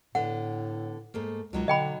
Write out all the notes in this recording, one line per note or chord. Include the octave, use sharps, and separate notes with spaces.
A2 D3 B3 F#5
G#2 A3 A#3
C#2 B2 F#3 D#4
D3 D#5 G5 B5